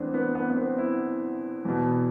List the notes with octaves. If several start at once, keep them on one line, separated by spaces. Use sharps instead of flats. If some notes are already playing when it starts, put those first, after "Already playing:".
Already playing: E2 E3 A3 B3 C4 D4
B3
B3
B3
C4
E4
E2 B2